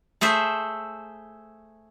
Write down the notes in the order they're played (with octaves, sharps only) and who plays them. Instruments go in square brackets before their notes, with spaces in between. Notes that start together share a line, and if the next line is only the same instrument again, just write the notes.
[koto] A3 G#4 C5 E5